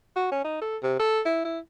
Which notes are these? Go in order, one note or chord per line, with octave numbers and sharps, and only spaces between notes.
F#4
C#4
D#4
A4
C3
A4
E4
E4